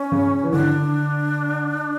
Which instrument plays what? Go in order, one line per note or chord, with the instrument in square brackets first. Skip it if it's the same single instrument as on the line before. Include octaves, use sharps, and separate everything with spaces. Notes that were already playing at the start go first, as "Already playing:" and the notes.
Already playing: [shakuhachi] C#4
[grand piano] C#3
E3
[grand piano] D3 [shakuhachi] D4